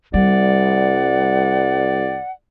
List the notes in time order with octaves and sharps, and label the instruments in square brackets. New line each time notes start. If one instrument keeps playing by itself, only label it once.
[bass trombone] C2 [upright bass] G3 [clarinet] D5 [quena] F#5